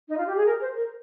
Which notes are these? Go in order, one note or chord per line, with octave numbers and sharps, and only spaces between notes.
D#4
F4
G4
G#4
A#4
C5
A#4